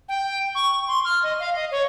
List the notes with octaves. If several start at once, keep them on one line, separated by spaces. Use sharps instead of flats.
G5
C#6
C6
F6
D#5
F5
D#5
C#5